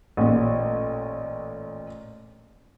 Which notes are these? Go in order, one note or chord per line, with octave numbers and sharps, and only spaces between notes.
A1 A#2